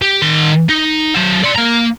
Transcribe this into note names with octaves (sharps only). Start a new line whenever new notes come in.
G4
D#3 C6
D#4
F#3 C5
D5 C6
A#3 A#5